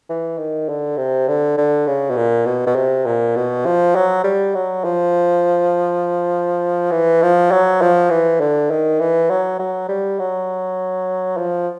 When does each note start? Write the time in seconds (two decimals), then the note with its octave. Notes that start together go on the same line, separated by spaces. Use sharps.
0.09 E3
0.38 D#3
0.69 D3
0.97 C3
1.28 D3
1.58 D3
1.87 C#3
2.10 B2
2.17 A#2
2.46 B2
2.67 B2
2.76 C3
3.06 A#2
3.36 B2
3.66 F3
3.95 F#3
4.24 G3
4.55 F#3
4.84 F3
6.92 E3
7.22 F3
7.51 F#3
7.82 F3
8.10 E3
8.40 D3
8.71 D#3
9.00 E3
9.30 F#3
9.59 F#3
9.89 G3
10.19 F#3
11.37 F3